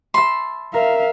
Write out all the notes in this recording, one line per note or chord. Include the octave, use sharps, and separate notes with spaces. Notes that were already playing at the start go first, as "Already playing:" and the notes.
E5 A5 B5 C6
A#4 E5 F5